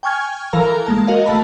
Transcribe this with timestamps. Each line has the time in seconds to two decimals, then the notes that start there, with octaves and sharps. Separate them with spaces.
0.03 G5 G#5 C#6 F6 G#6
0.53 E3 A4 A#4 F5 A#5
0.86 G#3 A#3 A5
1.07 F#4 A#4 D#5 F5
1.26 A3 A5 B5